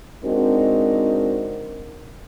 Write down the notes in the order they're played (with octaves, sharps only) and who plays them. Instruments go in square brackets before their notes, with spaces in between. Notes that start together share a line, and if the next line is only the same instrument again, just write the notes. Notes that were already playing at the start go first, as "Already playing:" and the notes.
[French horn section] G#3 C4 D4 D#4 F#4 A#4